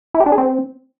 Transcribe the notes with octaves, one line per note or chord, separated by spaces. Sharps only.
E4
G4
D4
G#4
C4